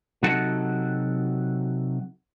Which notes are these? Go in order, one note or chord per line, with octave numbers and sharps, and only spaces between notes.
C3 F#3 D#4 F#4 A4 F#5